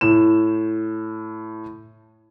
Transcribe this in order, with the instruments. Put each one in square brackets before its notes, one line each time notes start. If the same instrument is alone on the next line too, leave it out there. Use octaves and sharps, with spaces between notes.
[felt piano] A2 E7